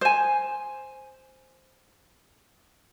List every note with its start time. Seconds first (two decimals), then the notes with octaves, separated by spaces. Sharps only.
0.01 C5 G#5